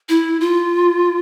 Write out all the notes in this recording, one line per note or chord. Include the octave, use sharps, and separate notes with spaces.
E4
F4